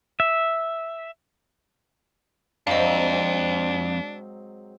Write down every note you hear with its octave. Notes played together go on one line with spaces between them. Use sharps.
E5
F2 G#2 F#3 C4 D4 D#5 F5